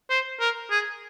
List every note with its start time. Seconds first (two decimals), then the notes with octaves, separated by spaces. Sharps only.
0.10 C5
0.40 A#4
0.71 G#4